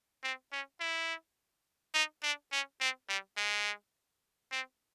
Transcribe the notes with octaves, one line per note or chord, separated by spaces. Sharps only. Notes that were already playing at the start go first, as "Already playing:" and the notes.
C4
C#4
E4
D#4
D4
C#4
C4
G3
G#3
C4